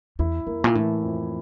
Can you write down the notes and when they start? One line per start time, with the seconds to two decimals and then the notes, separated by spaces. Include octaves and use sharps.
0.19 E2 E4
0.46 F2 A#3
0.64 A#2
0.75 A2 E3
1.03 F2